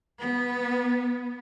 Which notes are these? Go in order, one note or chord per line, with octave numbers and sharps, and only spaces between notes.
B3